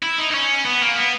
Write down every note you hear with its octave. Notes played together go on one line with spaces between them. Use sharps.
E4
D#4
D#4
C#4
B3
A#3
B3